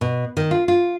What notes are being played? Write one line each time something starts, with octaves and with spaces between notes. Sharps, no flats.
B2
D#3
F4
F4